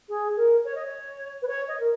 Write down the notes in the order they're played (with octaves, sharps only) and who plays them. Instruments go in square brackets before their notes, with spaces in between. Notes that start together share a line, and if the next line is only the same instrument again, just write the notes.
[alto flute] G#4
A#4
C#5
D#5
C#5
B4
C#5
D#5
A#4